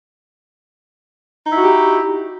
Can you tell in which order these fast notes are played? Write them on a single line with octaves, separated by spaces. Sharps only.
D#4 E4 F#4 G4